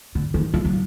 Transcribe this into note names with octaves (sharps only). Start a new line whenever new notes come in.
D3
D#3
F3
F#3